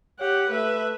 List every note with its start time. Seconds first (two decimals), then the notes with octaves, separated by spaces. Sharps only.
0.20 G4 C#5 F#5
0.50 A3 B4 E5